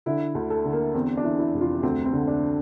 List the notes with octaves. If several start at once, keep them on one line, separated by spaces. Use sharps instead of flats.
D3 E4
D2
A4
D3
A#3
E2 C4
D4
E3
E4
F1
F4
D2 C4
C4
D3
D4